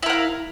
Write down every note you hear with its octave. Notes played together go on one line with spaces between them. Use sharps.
E4 A#4 F5 F#5